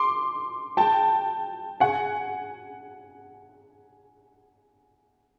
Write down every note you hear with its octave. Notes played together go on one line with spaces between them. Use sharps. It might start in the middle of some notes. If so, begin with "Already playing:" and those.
Already playing: C6 D6
G5 A5
F#5 G#5